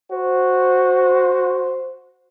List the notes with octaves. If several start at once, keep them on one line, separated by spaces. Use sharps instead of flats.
F#4 C5